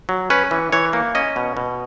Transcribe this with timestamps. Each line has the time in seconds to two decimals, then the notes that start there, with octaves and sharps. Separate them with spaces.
0.09 F#3
0.30 C#4 B4
0.51 E3
0.72 E3 C#5
0.93 A#3
1.15 C#4 D#5
1.36 B2
1.57 B2